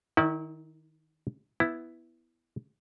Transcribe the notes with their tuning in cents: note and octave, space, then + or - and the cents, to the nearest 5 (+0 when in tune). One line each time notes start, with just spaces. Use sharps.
D#3 +0 E4 -35 D5 +15
B3 +0 E4 +0